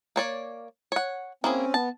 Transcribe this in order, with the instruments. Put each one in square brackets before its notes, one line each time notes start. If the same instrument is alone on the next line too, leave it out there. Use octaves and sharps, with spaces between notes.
[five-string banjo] A#3 C#5 D5
C#5 F#5
[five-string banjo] A#3 E4 G#4 [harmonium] C4 C#4
[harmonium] B3 [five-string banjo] A5